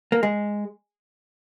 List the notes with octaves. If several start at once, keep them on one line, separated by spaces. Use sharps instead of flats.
A#3
G#3